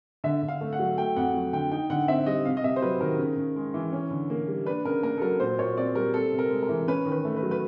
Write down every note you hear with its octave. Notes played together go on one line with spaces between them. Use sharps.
D3 E5
D3
F5
A3
F#5
F#3
A3 G5
F2 F#5
F#3
D3 G5
D#4 G5
D3 F#5
C4 E5
G3 D#5
C3 F5
D#5
C3 E5
C5
F#3 B4
D#3 A#4
C#3
C#3
G#3
E3
C#4
D3
A#3
G3
D4 B4
C#3 A#4
A#3 A#4
A4
F#3 A#4
A#2 C5
A#2 C#5
C4 D5
G3 A#4
C4 A4
C3
A#4
G#3
A#4
E3
C#4 B4
D#3
B4
A3
B4
F#3
B4